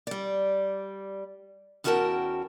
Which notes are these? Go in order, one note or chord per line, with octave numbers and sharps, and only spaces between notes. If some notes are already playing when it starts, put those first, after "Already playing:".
G3 D5
E2 C#4 F#4 A#4 G5 A5